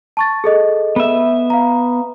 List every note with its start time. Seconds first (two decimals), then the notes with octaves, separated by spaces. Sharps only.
0.17 A5 C#6 A6
0.44 G#4 A4 D#5
0.96 B3 E5
1.50 F5 A#5